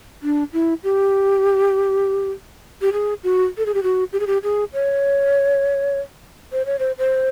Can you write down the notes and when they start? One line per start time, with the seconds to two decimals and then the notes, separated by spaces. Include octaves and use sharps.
0.23 D4
0.53 E4
0.84 G4
2.82 G4
2.93 G#4
3.23 F#4
3.58 A4
3.66 G#4
3.74 G4
3.83 F#4
4.13 G4
4.20 G#4
4.27 G4
4.43 G#4
4.73 C#5
6.52 C5
6.66 C#5
6.79 C5
6.98 C5